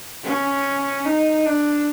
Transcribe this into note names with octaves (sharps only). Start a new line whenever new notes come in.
C#4
D#4
D4